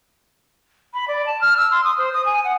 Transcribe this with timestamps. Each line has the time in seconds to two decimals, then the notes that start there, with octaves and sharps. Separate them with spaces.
0.94 B5
1.08 D5
1.26 A5
1.41 F6
1.57 E6
1.71 C6
1.84 D#6
1.98 C5
2.13 D#6
2.25 G#5
2.44 F#5